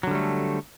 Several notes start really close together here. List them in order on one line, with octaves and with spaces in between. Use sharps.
F#3 D3 G3 A3